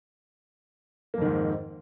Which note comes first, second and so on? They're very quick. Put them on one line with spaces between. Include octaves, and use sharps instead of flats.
A#3 F2 D#3 G#2